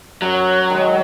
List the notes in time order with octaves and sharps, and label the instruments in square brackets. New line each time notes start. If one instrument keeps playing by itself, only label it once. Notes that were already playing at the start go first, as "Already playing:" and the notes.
[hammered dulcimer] F#2 [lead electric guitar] F#3
[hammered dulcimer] D#3 G#3